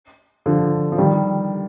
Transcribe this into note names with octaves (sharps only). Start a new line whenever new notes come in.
D3 F3
F3
D#3 G3